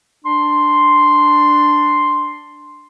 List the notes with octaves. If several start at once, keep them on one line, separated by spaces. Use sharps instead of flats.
D4 C6